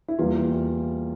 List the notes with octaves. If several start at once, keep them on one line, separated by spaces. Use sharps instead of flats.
E4
E2 E3 G3 A#3 F4